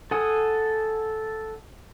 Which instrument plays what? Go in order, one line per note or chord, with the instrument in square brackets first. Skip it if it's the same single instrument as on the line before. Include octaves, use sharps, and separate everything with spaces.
[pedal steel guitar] A4 F#5 G#5 D#6